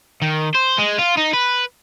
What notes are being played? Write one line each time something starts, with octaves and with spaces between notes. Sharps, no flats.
D#3
C5
G#3
F4
D#4
B4